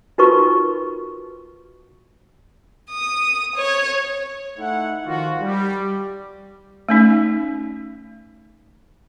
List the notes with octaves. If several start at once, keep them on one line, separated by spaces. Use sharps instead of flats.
D#4 F4 F#4 A#4 B4 C#6
D#6
C#5
A3 D#4 E4 F#5
D#3 F3 F4 F#4
G3
A3 C#4 D#4